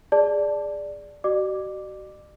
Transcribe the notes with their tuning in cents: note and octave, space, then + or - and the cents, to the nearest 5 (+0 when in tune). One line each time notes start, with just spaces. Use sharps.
G#4 -10 D5 +0 A5 +0
F#4 +40 D5 +45 D6 +0